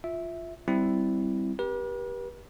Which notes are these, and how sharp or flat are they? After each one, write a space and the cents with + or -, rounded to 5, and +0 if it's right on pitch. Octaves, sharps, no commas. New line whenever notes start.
F4 +0 E5 -5
G3 +0 C4 -5 E4 +0
G4 +0 B4 -45